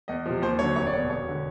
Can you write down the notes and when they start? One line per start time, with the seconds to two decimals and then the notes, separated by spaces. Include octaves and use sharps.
0.08 E2 D#5
0.26 C3 F3
0.42 D#2 C5
0.59 D3 F#3 C#5
0.76 F1 C#5
0.86 D5
0.93 E2 B2 C#5
1.10 E1 C#5
1.28 D3